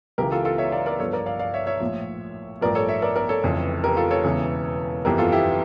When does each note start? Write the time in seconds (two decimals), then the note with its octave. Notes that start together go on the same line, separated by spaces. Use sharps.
0.18 C#2 C#3 E3 G4 A#4
0.32 F4 A4
0.45 F4 A4
0.58 C#5 E5
0.72 D5 F5
0.86 A#4 D5
0.99 G1 G2 F3 A4 C#5
1.13 A#4 D5
1.26 D5 F5
1.39 D5 F5
1.54 C#5 E5
1.67 C#5 E5
1.80 A#1 A2 F3
2.61 A1 G2 F3 A#4 D5
2.75 A4 C#5
2.88 C#5 E5
3.02 A#4 D5
3.16 A#4 D5
3.29 A4 C#5
3.43 F1 F2 C#3 E3
3.84 G4 A#4
3.97 F4 A4
4.11 A4 C#5
4.24 E1 E2 C#3 E3
5.05 G1 F2 E3 G4 A#4
5.18 F4 A4
5.28 A4
5.32 E4 G4